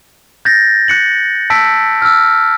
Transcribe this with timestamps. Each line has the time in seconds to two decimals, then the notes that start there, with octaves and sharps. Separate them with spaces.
0.45 G6 A6 A#6
0.88 F#6 C#7 F#7
1.50 A5 E6 B6 D7
2.02 E6 F6